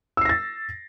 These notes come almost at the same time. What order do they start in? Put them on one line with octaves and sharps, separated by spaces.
E6 C7 A#6 A6